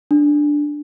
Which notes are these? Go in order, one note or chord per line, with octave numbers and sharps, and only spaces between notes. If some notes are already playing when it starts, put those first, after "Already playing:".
D4